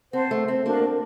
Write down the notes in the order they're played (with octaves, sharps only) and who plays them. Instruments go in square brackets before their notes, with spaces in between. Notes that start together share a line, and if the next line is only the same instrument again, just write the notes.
[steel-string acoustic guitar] C4 [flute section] C5 F#5 A5
[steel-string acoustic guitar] A3
C4
[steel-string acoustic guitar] A#3 [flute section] D4 F#4 A#4